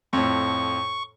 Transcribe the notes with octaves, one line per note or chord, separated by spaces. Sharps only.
F2 A2 C#6